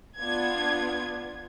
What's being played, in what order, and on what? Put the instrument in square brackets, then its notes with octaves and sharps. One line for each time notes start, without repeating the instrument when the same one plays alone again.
[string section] B3 D4 F4 G#6